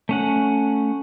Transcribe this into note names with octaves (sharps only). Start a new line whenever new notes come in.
A3 C#4 F#5